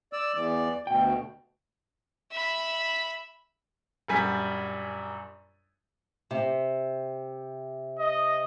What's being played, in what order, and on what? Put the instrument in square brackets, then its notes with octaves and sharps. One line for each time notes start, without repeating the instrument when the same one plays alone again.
[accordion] D5 E6
E2 E3 D5
[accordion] D2 B2 [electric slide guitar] G5
[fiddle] E5 B5
[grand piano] A#1 F#2 G3 G#5 B6
[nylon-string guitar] C3
[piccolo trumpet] D#5